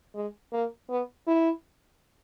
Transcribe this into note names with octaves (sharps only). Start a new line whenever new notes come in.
G#3
A#3
B3
E4